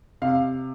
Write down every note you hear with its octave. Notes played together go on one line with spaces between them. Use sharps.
C3 F5